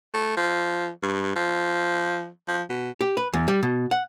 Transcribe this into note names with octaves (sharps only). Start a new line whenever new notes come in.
A3
F3
G2
F3
F3
B2
G4
B4
E2
G3
B2
F#5